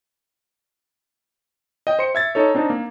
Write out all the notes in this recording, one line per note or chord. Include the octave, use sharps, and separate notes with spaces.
D#5 G5
C5 C6 C#7
E5 G#6 A6
D#4 A4 C#5
C4 D4 D#4
A#3